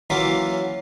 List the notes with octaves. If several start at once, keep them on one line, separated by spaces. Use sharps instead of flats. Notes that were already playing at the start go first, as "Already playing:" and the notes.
E3 F#3 A#3 C#4 E4 F4